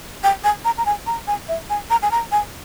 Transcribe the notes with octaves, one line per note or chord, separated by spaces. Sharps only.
G5
G#5
A#5
A#5
G#5
A#5
G#5
E5
G#5
A#5
G#5
A#5
G#5